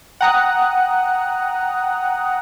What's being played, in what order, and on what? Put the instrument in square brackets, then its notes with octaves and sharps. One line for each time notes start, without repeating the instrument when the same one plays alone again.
[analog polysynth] F#5 G5 A#5 D#6 F#6